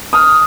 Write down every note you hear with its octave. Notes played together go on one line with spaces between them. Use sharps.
D#6 F6